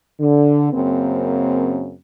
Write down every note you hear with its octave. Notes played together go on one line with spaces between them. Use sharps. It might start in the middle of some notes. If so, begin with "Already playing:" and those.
D3
F#2 C#3 A#3 C4